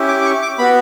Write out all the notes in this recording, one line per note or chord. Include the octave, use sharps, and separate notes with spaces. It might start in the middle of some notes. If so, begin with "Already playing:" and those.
Already playing: C#4 E4 G4
D6
D6
C#6
D6
B3 F#4 B5